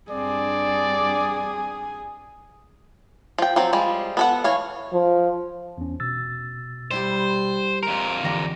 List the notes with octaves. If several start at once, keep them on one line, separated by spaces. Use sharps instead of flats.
G2 C4 D4 G#4 D5
F3 G5
F3 F#3 C4
F3 G3 G#3
B3 A4 F#5
E3 C#5 F5
F3
E2 C#4
B2 E6 A6
G3 E4 G4 C5
F2 A#4 A#5
E2 D3 E3 G4 D5 A#6